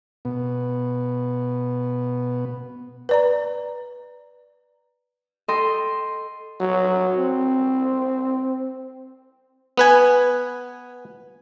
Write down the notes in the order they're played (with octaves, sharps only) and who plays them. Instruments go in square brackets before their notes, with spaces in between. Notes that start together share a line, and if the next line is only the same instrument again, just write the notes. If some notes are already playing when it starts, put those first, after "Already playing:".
[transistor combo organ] B2 B3
[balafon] B4 D5 A#5
[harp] A4 D#5 G5 C6
[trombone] F#3
C4
[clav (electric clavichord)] B3 B4 G#5